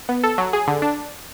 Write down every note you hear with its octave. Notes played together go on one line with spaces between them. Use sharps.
B3
A4
F#3
G#4
D3
D4